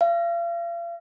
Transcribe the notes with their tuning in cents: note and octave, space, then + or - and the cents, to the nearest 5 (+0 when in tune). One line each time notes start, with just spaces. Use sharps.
F5 -40